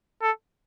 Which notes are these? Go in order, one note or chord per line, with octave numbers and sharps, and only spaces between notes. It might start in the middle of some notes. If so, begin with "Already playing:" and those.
A4